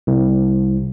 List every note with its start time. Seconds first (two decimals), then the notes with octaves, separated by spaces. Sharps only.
0.07 C2